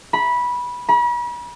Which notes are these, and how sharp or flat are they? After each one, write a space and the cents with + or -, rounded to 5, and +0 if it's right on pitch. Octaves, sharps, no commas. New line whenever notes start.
B5 -15
B5 -40